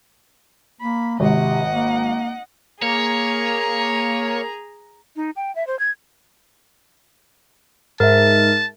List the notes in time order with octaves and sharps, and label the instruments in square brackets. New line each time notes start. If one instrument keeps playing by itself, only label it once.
[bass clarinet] A#3 [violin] B5
[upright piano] G#1 [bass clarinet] C3 [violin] D#5 F#5
[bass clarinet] A#3
[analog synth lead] A#3 [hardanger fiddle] G#4 A#5 [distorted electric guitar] C#5
[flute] D#4
G5
E5
C5
G#6
[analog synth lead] G#2 [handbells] A#4 E5 [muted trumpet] A5